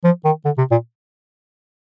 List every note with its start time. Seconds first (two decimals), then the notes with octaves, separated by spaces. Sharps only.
0.04 F3
0.25 D#3
0.45 D3
0.58 C3
0.71 A#2